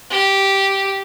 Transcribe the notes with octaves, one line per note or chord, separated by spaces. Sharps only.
G4